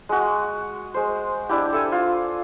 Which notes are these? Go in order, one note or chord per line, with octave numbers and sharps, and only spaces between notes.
G#3 F#4
G#3 C5
D4 E4 G4
A4 E5 G#5
F4